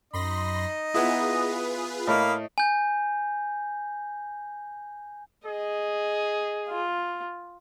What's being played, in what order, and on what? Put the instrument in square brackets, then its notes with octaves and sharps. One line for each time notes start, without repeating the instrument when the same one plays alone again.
[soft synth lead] F#2 [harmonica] D#4 D#5 [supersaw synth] B5 C6 A#6
[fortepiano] B3 E4 [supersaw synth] F4 G#4 B4 [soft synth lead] D#6
[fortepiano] A2 [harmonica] A#3 F5 B5 [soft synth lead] D#5
[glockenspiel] G#5 G6
[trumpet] G#4 [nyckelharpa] D#5
[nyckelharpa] F4